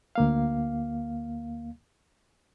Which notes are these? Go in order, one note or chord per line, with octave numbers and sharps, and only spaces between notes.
D2 A#3 F5